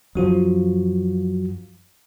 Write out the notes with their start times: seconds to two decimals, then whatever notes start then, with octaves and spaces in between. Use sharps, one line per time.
0.15 F#2 F3 F#3 F#4